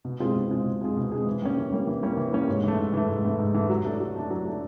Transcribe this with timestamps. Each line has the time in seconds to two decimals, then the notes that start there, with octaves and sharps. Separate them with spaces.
0.05 B2
0.20 G#3 C4 F4 G#4
0.36 B2
0.50 G#3 C4 F4 G#4
0.65 B2
0.81 G#3 C4 F4 G#4
0.97 B2
1.12 G#3 C4 F4 G#4
1.26 E3
1.42 G3 A#3 C#4
1.57 E3
1.72 G3 A#3 C#4
1.87 E3
2.03 G3 A#3 C#4
2.17 E3
2.33 G3 A#3 C#4
2.48 G#2
2.64 E3 A3
2.78 G#2
2.93 E3 A3
3.09 G#2
3.24 E3 A3
3.39 G#2
3.54 E3 A3
3.70 F#3
3.84 A3 D4
4.00 F#3
4.16 A3 D4
4.30 F#3
4.45 A3 D4